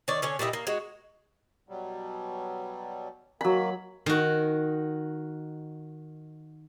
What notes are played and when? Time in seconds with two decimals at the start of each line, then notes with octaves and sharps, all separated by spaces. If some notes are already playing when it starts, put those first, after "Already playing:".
0.08 D#3 C#5 D5
0.22 D3 C#4 C#5
0.39 A#2 G3 E4 D#5
0.53 A#3
0.67 G#3 F#4
1.69 B2 F#3 G3
3.41 D#3 F#3 A#3 B5
4.06 D#3 F#4